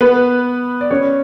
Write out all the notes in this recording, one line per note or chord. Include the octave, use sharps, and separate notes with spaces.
B3 B4
D5
C#4 C#5